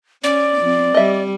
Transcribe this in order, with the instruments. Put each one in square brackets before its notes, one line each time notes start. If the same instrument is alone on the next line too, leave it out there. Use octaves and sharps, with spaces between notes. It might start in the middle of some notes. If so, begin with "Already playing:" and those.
[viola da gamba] C#4 [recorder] D5
[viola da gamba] F3 C4
[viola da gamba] G3 [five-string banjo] D#5 E5